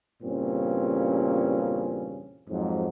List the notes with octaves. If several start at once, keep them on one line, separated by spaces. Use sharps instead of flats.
E2 G2 A#2 C#3 C4 C#4
F2 G#2 F#3